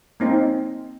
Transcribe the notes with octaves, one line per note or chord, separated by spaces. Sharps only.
A#3 C4 D#4